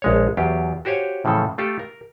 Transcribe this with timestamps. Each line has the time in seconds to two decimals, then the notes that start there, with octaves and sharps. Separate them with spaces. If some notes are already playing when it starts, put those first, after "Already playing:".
0.02 A#1 G#3 C#5
0.37 E2 F#3 F4 G4
0.85 F#4 G4 C5 C#5 F5 G#5
1.25 A2 C#3 E3 F3 A4
1.58 A3 F4 G4 A4
1.79 A#4